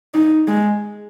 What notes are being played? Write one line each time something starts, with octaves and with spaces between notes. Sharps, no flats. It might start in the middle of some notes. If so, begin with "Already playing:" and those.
D#4
G#3